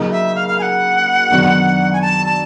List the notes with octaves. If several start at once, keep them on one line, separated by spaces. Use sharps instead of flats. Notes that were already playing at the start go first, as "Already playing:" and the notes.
Already playing: C#3 F#3 A#3 D#4 F#4
E5
F5
F5
G#5
F#5
F#2 D#3 F#3 B3 D4
G#5
A5
A5